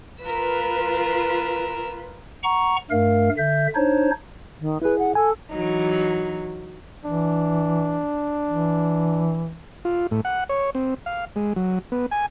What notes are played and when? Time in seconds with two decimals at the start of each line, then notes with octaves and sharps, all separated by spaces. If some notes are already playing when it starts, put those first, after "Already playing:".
0.22 F4 A#4 B4 E6
2.43 F#5 A#5 C#6
2.91 G2 A3 A#4 F5
3.37 D3 E5 G6
3.75 D4 D#4 C5 C#5
4.60 D#3
4.82 E4 G#4 B4
4.99 F#5
5.15 A4 G#5
5.51 E3 F#3 D#4
7.05 E3 D4
8.47 E3
9.85 F4
10.11 A2
10.25 F#5
10.49 C#5
10.75 C4
11.06 F5
11.36 G#3
11.56 F#3
11.92 B3
12.11 G#5